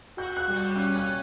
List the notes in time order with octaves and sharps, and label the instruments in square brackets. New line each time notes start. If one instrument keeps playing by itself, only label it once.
[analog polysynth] F#4 [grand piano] G6
[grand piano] F#6
[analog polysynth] G3
[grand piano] G6
[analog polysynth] C#4 [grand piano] F#6
[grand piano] F#6
[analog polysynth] C#4